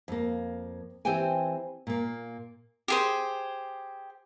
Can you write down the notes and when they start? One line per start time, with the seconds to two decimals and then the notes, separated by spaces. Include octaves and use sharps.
0.08 F2 A#3
1.05 E3 C4 G4 C5 G5 G#5
1.87 A#2 A#3
2.88 G4 G#4 C5